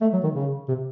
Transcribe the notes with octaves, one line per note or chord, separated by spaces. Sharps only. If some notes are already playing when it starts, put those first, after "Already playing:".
A3
F#3
D#3
C#3
C3